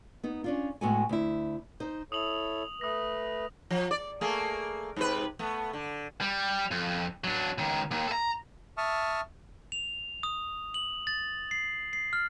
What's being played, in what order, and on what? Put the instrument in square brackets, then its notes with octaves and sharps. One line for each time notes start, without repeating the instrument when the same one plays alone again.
[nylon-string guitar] B3 D#4
C#4 D4 F4
A2 G#3 B3 F#4 A4 G#5
D2 E4
D#4 C5
[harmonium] E4 A4 C#5 [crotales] D#6 F7 F#7
[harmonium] A3 B4 [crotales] D#6 A#6
[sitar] F3
D5
A3 A#3 G#4
G#2 C3 B4
A3 B3
D3
[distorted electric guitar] G3
F2
F#3 D4
C#2 D#3
D#2 D#3
A4 A#5
[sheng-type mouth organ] E5 A5 C#6 D#6 F6
[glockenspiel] F7
D#6
F#7
A6
C7
C7
F6